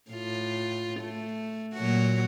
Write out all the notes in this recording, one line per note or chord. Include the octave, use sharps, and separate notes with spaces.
A2 F4
A3
A#2 F#3 F#4